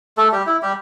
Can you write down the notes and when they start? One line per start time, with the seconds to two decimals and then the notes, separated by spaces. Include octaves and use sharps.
0.17 A3 A4
0.32 G3 G4
0.46 E4
0.62 G3 G4